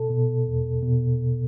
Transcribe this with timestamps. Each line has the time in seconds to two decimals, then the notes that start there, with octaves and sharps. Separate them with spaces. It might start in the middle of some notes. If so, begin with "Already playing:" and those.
Already playing: B2 A4
0.10 B2
0.47 E2
0.83 B2